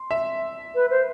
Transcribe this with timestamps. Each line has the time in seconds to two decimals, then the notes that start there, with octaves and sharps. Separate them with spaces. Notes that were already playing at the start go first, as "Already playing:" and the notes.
Already playing: C6
0.11 E5
0.75 B4
0.90 C5